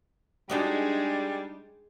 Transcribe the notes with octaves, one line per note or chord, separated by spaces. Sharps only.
G3 G#3 D4 D#4 F#4 G#4